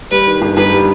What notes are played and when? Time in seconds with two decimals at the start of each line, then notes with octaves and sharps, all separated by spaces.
0.11 G3 B4
0.27 D#3
0.42 G1
0.57 G1 B4
0.73 G3